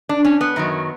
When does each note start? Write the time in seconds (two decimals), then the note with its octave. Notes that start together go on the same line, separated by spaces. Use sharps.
0.09 D4
0.25 C#4
0.41 B3
0.56 F#2 D#3 F#3